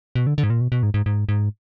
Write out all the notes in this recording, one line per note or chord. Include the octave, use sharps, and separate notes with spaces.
B2
D3
D3
G#2
A#2
B2
B2
G#2
G#2
G#2
G#2